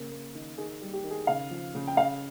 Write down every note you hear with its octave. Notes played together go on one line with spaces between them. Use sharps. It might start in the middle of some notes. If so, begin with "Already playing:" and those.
Already playing: C#3 A#3
A#3
D#3
D#3 G#4
G3
G4
D#3
G#4
C#3 F5
F3
C#3
G5
C#3 F5